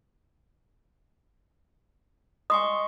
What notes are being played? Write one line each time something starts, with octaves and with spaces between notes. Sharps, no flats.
D#5 G#5 C6 C#6 D#6